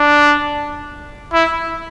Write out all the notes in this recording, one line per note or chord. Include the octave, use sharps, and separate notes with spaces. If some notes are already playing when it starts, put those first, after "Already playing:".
Already playing: D4
E4